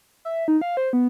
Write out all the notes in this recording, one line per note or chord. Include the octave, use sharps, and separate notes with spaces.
E5
D#4
F5
C5
B3